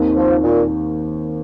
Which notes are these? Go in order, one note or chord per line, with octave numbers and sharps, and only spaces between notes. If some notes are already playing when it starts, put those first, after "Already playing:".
Already playing: D#2 D#3 C4 D#4 A#4
F3
A#2